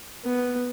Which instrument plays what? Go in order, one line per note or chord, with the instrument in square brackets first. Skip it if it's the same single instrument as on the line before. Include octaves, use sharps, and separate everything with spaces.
[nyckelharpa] B3